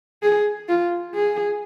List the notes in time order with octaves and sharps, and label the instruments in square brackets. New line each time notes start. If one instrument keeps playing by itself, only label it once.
[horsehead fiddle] G#4
F4
G#4